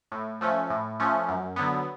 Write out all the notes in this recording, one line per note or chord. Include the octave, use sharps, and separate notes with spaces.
A2
F3 A3 C#4
A2
F3 A3 C#4
F#2
D3 F#3 B3